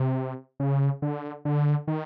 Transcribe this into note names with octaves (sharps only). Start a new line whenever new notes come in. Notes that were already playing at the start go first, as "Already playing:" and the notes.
Already playing: C3
C#3
D3
D3
D#3